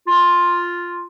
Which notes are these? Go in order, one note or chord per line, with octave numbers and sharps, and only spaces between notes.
F4